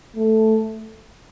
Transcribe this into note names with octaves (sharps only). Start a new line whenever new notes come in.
A3